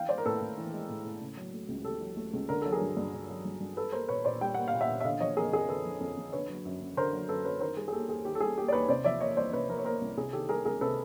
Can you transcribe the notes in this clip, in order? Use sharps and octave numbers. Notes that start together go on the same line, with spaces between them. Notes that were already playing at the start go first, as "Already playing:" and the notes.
Already playing: E3 F5 G5
G#3 C5 D5
A#4
A2 A4 B4
A2
E3
G#3
A2
A2
C#3
F#3
A3
C#2
C#3 G4 A4
F#3
A3
C#2
D3 A#4
F#3 A4
G#4 A#4
G2
G2
D3
F#3
G2
G2
G3 A4 B4
A#3 A#4 C5
A#2 B4 C#5
A#2 C5 D5
G3 G5
A#3 F#5
F5
A#2
E5 F#5
A#2
E5
D3 D#5 F5
F3 C#5 D#5
F2 G#4 A#4
F2 G#4 A#4
D3 A4 B4
F3
F2
F2
D3 B4 C#5
F#3
F#2
F#2
D3 A#4 C5
F#3
F#2 A4 B4
F#2 B4 C#5
D#3 A#4 C5
G3 G#4
G#4
A#3 G4 A4
D#2 G#4
D#3 G4
A4
G3 G#4
A#3 G4
D5
D#2 B4 C#5
C3 C5 D5
F3 D5 E5
A#3 C#5 D#5
C2 C5 D5
C3 B4 C#5
F3 A#4 C5
C#5
A#3 A#4 C5
C2
C3 G#4
D#3 G4 A4
G3 G#4 A#4
C#2 G#4 A#4
C3 A4 B4